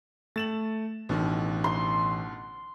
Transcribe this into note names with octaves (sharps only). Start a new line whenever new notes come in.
A3 A6 E7 F#7
A1 B2 D3 D#3
C6